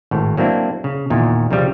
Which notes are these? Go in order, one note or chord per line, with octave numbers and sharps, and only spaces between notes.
G#1 A2
F#3 A#3 C4 D4 E4
C#3
E2 A#2 D#3
C2 C#3 F3 G3